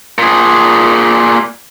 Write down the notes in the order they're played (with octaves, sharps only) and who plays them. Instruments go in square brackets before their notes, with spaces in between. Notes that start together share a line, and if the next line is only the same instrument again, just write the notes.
[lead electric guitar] A#2 G#4